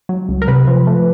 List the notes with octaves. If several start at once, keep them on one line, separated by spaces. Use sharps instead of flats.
F#3
C#2
A#4
C3 B4
F3
A3